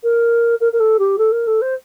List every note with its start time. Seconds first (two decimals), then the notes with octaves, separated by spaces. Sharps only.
0.03 A#4
0.60 A#4
0.73 A#4
0.80 A4
0.99 G4
1.18 A4
1.32 A#4
1.47 A4
1.61 C5